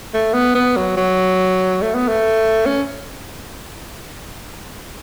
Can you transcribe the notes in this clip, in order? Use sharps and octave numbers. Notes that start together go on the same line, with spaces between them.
A3
B3
B3
F#3
F#3
A3
B3
A3
C#4